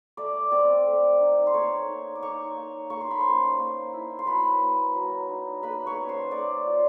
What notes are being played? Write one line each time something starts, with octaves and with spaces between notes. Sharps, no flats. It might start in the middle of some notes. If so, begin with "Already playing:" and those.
A3 D5 D6
C4 D5 D6
A3
D#4
C6
A#3 C#5 C#6
D#4
D6
D#4 C#5 C#6
A#3
A#3 C#6
C6
B5
C#4 C5 C6
A#3
E4
C6
F#3 B4 B5
A#3
F#3
D#4
A#3 B4 B5
C#5 C#6
C#4
C5 C6
A#3 D5 D6
F4